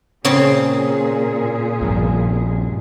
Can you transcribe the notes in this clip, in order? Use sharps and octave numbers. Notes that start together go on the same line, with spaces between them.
A#2 C#3 C4 G#4 C#5
A#1 G2 F3